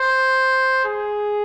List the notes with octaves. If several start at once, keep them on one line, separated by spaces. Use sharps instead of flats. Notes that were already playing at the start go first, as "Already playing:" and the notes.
Already playing: C5
G#4